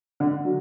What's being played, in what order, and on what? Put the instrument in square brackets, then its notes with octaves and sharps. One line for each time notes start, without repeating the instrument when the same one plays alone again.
[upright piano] D3
F#3